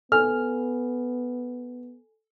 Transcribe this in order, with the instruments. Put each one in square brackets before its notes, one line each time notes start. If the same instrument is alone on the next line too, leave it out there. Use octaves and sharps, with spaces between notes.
[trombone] B3 [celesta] A4 G#5 [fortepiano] F6